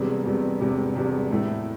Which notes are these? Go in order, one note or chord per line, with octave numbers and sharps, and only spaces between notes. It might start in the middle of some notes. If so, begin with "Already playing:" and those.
Already playing: E1 E2 C3 G3
E1 E2 C3 G3
E1 E2 C3 G3
E1 E2 C3 G3
A2 A3 E4